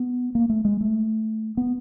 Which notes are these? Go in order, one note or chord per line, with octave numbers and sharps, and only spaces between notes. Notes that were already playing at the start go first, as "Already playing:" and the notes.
Already playing: B3
A#3
A3
G#3
A3
B3